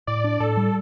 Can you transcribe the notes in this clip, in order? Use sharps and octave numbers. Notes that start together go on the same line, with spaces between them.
A2 D5
D4
A2 A4
G3